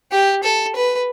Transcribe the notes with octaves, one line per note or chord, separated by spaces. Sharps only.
G4
A4
B4